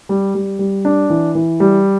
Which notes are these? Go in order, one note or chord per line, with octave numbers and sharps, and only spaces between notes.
G3
G3
G3
D4
E3
E3
G3